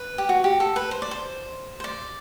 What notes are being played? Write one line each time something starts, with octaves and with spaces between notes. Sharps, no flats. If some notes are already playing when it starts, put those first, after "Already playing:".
Already playing: B4
G4
F#4
G4
A4
B4
C5
D5
C5
C5
D5